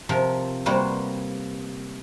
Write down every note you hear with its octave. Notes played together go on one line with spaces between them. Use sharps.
C3 F3 A#4
C3 G3 A#3 F#4 B4 C5